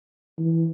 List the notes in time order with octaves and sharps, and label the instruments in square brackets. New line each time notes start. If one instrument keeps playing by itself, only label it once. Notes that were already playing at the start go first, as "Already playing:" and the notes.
[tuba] E3